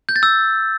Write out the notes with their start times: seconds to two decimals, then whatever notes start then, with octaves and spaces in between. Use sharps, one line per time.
0.09 G6
0.16 A6
0.23 E6